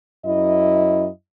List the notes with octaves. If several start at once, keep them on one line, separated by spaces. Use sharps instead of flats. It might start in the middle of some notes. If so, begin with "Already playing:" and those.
F#2 E4 D#5